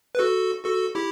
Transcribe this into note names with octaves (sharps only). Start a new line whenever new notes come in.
B4
F#4 A4
F#4 A4
E4 G4